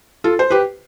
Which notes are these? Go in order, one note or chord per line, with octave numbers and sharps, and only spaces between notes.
F4 A4
C5
G4 B4